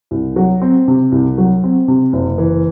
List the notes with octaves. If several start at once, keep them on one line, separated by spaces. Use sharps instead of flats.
C2
F#3
C4
C3
C2
F#3
C4
C3
F#1
E3